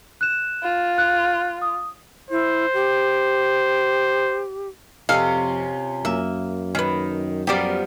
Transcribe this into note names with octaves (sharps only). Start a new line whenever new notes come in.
F#6 E7
F4
F#6
D#6
E4 C5
G4
F2 C3 C#4 F4 A4 D#5 F5
F#2 A#3 E5
D#3 C#4 B4
F3 G3 B3 G4 A#4 D5 A#5